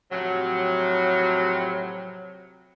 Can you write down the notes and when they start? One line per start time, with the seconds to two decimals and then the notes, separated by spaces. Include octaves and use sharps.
0.11 A2 C3 F3 F#3